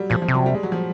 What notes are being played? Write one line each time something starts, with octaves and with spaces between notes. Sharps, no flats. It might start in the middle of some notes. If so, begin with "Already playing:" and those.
Already playing: F#3 G3
A#2 F3
F3
C3
F#3
G3
G#3
F#3
F3